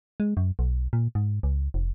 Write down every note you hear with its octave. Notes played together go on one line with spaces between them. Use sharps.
G#3
F#2
B1
A#2
G#2
C#2
F1